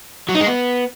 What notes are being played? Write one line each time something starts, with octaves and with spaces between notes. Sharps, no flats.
F#3
D#4
G#3
B3